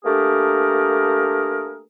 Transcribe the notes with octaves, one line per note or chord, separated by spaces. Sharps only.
A3 A#3 D4 G4 G#4 A#4